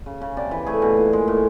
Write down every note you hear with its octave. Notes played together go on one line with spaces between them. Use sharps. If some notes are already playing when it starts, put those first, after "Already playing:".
C#3
C#3
C3 D5
E3
A3 G#4
B2
A#2
G#3
A2